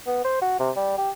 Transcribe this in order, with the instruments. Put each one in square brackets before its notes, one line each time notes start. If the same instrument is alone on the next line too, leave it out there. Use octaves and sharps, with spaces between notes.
[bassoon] B3
C5
F#4
C3
G3
G4